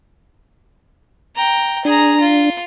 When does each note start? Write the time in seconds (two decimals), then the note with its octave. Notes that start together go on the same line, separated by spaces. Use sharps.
1.36 G5 A#5
1.85 D4 G#4 A#5
2.20 F4